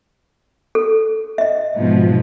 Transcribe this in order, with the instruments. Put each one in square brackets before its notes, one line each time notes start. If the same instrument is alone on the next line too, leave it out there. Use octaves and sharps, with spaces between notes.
[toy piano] A4
D#5 E5
[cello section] G#2 B2 F3